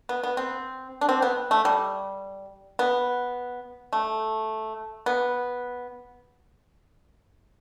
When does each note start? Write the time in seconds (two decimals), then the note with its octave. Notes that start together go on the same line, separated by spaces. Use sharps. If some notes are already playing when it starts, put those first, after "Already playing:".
0.09 B3
0.23 B3
0.37 C4
1.01 D4
1.09 C4
1.22 B3
1.51 A3
1.65 G3
2.79 B3
3.93 A3
5.06 B3